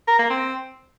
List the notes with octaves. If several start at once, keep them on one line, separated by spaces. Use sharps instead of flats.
A#4
A#3
C4